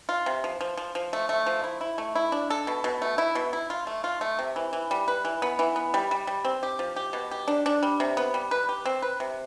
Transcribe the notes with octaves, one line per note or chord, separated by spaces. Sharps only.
F4
C3
F3
F3
F3
F3
A3
A3
F3
E4
E4
A3
E4
D4
A4
B2
B2
A3
E4
B2
E4
F4
A3
F4
A3
C3
E3
E3
G3
B4
E3
B3
E3
B3
G3
G3
G3
C4
G4
F3
G4
B2
G4
D4
D4
G3
C3
B3
G3
B4
G4
C4
B4
C3